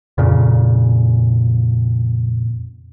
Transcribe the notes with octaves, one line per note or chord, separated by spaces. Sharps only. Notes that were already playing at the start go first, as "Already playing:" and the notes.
F2 A#2 C#3